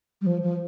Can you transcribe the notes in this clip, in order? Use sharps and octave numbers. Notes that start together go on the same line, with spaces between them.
G3
F3
F3